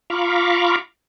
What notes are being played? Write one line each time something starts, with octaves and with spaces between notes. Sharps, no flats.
F4 F5 A#5 B5 C#6 D6